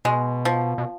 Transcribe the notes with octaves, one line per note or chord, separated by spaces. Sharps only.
B2 G#3
F3
B2